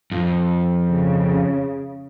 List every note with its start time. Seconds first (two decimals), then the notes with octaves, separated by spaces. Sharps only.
0.12 F2
0.89 C#3